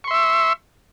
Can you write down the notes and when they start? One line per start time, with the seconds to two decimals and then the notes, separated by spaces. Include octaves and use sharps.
0.04 C#6
0.07 C6
0.11 E5
0.14 E6